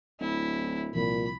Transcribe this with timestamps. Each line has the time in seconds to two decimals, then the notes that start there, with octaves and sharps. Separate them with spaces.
0.20 D1 E4
0.95 C2 A#2 F3 B5